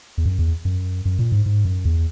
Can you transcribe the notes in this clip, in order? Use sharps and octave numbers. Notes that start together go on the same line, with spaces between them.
E2
F#2
E2
F#2
F#2
A#2
G#2
G#2
F#2
E2